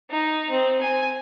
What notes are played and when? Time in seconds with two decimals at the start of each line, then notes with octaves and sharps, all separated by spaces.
0.10 D#4
0.50 C4
0.81 G#5